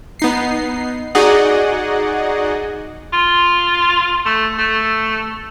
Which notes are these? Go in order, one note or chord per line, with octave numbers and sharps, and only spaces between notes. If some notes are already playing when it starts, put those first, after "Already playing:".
B3 D#4 C7
D#4 F#4 G#4 D5 D#5 F#5
F4
A3
A3